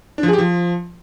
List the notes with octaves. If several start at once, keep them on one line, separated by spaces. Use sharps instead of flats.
D4
F3
G#4
G4
F3